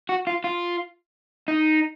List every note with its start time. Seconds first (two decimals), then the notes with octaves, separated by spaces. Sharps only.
0.09 F#4
0.27 F4
0.44 F4
1.48 D#4